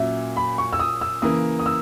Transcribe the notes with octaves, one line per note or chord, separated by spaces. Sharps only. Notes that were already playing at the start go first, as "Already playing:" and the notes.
Already playing: A#2 F#3 C#4 E5
B5
C#6
E6
D#6
E6
C#3 E3 A#3 D#6
D#6
E6